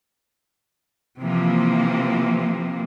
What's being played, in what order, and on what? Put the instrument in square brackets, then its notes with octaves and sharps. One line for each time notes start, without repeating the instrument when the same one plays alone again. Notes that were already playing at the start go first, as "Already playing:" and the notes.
[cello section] C3 E3 F3 A#3